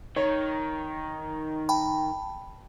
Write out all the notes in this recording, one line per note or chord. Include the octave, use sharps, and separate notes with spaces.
D#3 C#5
G5 A5 B5